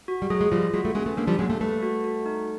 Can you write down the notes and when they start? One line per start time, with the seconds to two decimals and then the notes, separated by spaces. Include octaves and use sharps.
0.08 F#4
0.22 G3
0.30 F#3 G#3 G#4
0.41 G#3
0.52 F3 G3 F4
0.74 F#3 G#3 F#4
0.85 G3 A3
0.95 G#3 A#3 C#4
1.06 A3 B3
1.17 G#3 A#3 D4
1.27 F3 G3
1.39 F#3 G#3 A#3
1.50 G3 A3
1.60 G3 A3 B4
1.83 F#4
2.04 F#4
2.26 D#4